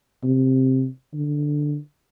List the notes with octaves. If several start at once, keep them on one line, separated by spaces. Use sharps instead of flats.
C3
D3